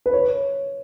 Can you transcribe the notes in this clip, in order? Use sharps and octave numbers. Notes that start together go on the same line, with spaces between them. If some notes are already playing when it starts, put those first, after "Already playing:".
B4
C#5